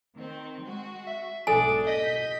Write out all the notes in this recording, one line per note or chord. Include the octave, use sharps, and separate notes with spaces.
D#3 C4
G#3 F#4
E5
B1 G#2 D4 A4 G#5
D#5 G6 B6